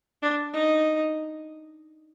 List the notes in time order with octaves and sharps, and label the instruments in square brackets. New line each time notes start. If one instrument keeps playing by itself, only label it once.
[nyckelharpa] D4
D#4